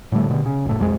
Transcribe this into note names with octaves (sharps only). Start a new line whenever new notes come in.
A2 D3 G3 A3
B2 D3
C#3
F#1 A2
C2 F2 F3 G#3